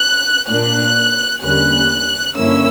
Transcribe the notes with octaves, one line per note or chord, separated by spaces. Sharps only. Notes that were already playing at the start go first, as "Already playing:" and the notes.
Already playing: F#6
A#2 A#3 D4 F#6
E2 D3 G3 A#3 C#4 F#6
G2 D3 A#3 C#4 E4 E6